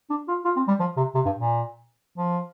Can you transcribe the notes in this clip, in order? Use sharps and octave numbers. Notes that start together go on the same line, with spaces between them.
D4
F4
F4
C4
G3
F3
C3
C3
G2
A#2
F3